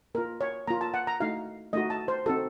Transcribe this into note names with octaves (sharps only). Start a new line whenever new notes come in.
A#3 F4 A#4
C#5
A#3 F4 A#5
A5
F#5
A#5
A3 D#4 F#4 F5
A3 D#4 F#4 D#5
A5
C5
C4 D#4 F#4 A4